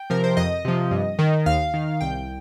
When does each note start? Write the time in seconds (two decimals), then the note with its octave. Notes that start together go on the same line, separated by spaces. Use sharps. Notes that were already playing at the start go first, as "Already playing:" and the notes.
Already playing: G5
0.10 C3 F3 A#4
0.24 C5
0.37 F2 D#5
0.65 C3 F3
0.91 G2
1.19 D#3
1.46 D#2 F5
1.74 D#3
2.01 C2 G5